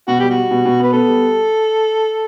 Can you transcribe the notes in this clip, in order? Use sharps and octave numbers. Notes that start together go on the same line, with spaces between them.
B2 F#4
G3 G4
F#4
G3
B2
B2
B3 B4
B3 A4
G3